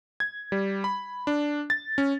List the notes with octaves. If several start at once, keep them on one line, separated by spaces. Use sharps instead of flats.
G#6
G3
B5
D4
A6
C#4